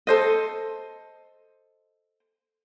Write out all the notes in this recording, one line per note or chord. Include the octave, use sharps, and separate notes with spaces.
A4 C5 D#5